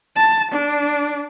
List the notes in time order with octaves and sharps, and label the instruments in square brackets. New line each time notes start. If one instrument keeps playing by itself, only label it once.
[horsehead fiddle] A5
D4